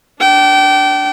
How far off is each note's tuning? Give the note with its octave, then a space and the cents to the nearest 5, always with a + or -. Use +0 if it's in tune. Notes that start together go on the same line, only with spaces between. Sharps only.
D4 +0 G5 -30